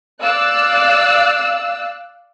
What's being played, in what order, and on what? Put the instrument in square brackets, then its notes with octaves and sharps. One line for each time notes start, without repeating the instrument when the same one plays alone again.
[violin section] D5 F5 E6 F#6